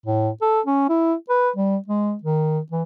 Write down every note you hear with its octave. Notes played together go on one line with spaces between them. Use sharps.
A2
A4
C#4
E4
B4
G3
G#3
D#3
E3